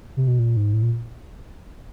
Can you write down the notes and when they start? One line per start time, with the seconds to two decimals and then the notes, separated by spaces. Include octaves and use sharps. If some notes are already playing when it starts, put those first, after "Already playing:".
0.17 C3
0.27 B2
0.39 A#2
0.57 G#2
0.73 A2
0.82 A#2